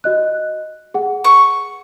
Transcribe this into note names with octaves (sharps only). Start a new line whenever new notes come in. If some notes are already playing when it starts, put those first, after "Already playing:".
F#4 D#5 F#6
G#4 F#5
C#6